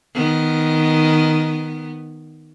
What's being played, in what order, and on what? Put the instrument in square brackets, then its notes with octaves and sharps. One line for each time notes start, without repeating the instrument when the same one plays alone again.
[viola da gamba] D#3 B3